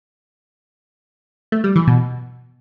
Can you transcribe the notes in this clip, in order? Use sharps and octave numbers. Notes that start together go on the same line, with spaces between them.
A3
G3
E3
B2